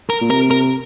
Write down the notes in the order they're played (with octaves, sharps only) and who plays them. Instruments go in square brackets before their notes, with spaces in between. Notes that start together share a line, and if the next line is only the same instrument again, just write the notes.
[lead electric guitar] A#4
[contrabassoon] A#2
[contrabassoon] C3 [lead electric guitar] A#4
[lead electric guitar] A#4